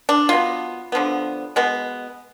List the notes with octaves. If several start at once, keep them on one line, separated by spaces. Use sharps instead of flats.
D4
B2 F#3 B3 F4
D3 F3 B3
B2 G#3 B3